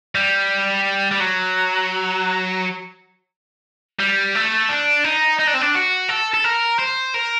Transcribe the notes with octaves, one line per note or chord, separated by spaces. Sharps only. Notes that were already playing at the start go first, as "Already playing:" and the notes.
G3
G3
F#3
G3
A3
D4
D#4
D#4
D4
C4
D4
F#4
A4
A4
A#4
C5
A#4